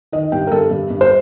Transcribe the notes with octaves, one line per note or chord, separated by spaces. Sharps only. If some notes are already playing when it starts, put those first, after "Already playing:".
D#3 D#5
G2 G5
A#4
G2 A4
G2
G2
C5